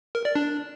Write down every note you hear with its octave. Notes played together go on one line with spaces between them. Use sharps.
A#4
D5
D4